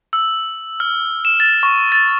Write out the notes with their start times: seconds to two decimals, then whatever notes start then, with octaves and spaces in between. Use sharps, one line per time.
0.13 E6
0.80 F6
1.25 E7
1.40 A6
1.63 C#6
1.92 A6